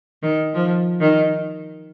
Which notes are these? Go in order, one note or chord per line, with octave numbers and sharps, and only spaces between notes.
D#3
F3
D#3